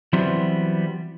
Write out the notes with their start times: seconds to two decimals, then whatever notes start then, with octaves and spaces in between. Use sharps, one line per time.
0.13 E3 F#3 G3 B3 C4